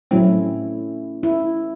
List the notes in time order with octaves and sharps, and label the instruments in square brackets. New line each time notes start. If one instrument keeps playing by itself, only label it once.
[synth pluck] A2 F#3 C4 [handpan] A3 C#4 E4
[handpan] E4